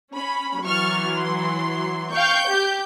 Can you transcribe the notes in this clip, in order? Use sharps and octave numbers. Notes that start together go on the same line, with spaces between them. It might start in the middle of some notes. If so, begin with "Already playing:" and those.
C#4 B5
E3 F#3 C#6 F6 A6
C6
F5 G5 C#6 G6
G4